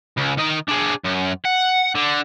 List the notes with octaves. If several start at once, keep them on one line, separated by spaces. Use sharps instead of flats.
C#2
D#3 D#5
D4 G#4
F#2
F#5
D3